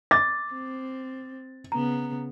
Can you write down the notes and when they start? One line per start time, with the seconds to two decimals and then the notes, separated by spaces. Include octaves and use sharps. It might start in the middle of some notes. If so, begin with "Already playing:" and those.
0.11 D6 A6
0.52 C4
1.72 C#3 B3 A#5